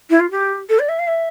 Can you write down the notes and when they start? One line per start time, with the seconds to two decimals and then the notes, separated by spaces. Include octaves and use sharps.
0.10 E4
0.20 F4
0.31 G4
0.69 A4
0.79 D5
0.88 E5
0.99 F5
1.07 E5